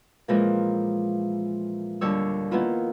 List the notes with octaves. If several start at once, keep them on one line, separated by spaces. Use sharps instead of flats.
A#2 E3 F3 G#3 A#3
D#2 D3 G3 C#5 E6
D#3 A#3 B3 E4 F4